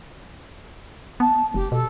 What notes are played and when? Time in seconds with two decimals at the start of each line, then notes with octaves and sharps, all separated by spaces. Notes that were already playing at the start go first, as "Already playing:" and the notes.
1.20 B3 A5
1.54 F1 G4
1.72 B2 A4